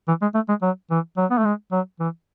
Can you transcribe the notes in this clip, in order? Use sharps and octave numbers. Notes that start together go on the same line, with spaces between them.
E3
G#3
A3
G#3
F#3
E3
F#3
B3
A3
G#3
F#3
E3